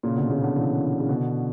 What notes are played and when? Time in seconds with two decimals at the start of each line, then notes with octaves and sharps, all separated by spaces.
0.03 A#2 C#3
0.16 B2 D3
0.30 A#2 C#3
0.43 B2 D3
0.56 C#3 E3
0.99 C#3
1.09 B2 D3